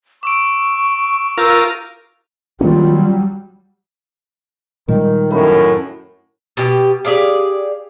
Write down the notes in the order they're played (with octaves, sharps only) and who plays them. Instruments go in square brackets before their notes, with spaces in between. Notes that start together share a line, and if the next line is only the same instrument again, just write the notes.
[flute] C#6 [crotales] D6 E6 D7
[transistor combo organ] F4 A#4 [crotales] C#6 G6 F7 [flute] E6
[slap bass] D#3 A#3 C#4 [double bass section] F#3 G3 [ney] F4
[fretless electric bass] A#2 G3 G#3 [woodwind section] D#3
[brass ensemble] F#2 A2 [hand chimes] A#4 B5
[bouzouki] B2 G4
G4 G#4 D5 F5